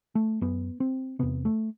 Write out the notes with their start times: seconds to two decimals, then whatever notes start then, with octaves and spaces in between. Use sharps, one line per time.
0.15 A3
0.41 F#2 B3
0.80 C4
1.19 E2 C3 B3
1.45 A3